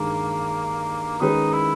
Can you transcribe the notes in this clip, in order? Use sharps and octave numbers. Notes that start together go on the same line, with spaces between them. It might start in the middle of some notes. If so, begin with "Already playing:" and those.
Already playing: G2 D#3 G#3 A#3
D#3 G#3 C#4 D#4 G#4 B4
E4